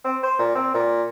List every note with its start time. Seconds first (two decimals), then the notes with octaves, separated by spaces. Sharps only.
0.04 C4
0.23 C5
0.39 A#2
0.55 C4
0.74 A#2